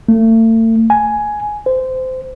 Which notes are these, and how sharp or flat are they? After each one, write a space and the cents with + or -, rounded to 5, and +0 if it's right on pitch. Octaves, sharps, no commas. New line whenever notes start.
A3 +40
G#5 +10
C5 -20